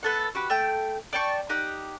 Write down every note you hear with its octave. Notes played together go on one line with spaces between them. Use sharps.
B3 A4 F#5
F#4 G4 B4
A3 G5
D5 G5 A5 C#6
D#4 G4 F#5